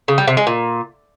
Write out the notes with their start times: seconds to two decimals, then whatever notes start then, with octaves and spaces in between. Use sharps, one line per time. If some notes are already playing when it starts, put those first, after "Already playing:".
0.08 C#3
0.18 G3
0.27 C3
0.37 G#3
0.47 A#2